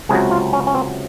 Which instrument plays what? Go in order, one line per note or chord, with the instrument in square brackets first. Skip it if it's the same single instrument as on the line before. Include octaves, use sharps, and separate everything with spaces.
[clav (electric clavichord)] C#2 C3 F#3 G#4
F4
C#4
C#4
C4